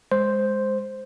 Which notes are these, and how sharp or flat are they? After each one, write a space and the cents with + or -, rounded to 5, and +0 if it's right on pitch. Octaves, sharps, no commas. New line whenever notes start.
G#3 -10 C5 +0